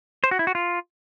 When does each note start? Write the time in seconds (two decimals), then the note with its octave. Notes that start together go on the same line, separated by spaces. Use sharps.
0.24 C5
0.31 F#4
0.39 E4
0.47 F#4
0.55 F4